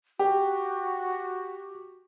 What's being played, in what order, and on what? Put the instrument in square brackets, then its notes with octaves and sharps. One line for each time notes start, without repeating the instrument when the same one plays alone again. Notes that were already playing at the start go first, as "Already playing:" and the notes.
[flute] F#4 [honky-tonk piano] G4